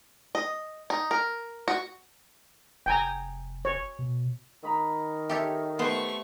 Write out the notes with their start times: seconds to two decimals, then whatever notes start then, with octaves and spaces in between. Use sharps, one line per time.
0.35 D#5
0.90 D#4
1.11 A#4
1.68 F#4
2.86 F1 G5 G#5 A#5
3.65 C#5
3.99 B2
4.63 D#3 A#5 B5 D#6
5.29 G4 A4 C#5 E5
5.79 A3 B3 C5 C#6